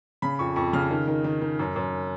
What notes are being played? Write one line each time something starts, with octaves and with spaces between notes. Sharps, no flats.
C#3 B5
F2 C#6
F2 C#6
C#3 F6
D#3
D#3
D#3
D#3
F#2
F#2